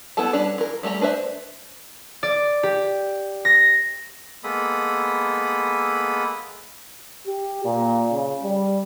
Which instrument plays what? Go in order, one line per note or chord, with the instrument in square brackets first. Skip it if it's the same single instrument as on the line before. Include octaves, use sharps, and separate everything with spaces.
[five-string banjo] B3 E4 A4 A5
G3 C#4 D4 B4
E3 A#4
G3 A3 G4 A#5
D4 B4 C5 E5
[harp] D5
G4
A#6
[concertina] G#3 A#3 B3 A4 B5 D#6
[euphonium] G4
A#2
C#3
G3